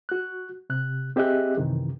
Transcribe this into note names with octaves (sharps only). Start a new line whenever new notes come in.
F#4 F#6
C3 F#6
C4 G4 G#4 D#5 E5 F#6
F#2 C3 D#3 E3